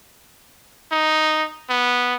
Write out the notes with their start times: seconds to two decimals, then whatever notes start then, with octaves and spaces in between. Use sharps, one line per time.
0.92 D#4
1.70 B3